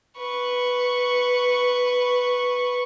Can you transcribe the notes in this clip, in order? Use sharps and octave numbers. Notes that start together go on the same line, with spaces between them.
B4 C#6